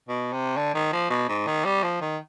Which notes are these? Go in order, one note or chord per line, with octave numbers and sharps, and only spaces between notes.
B2
C3
D3
D#3
F3
B2
G#2
D#3
G3
F3
D#3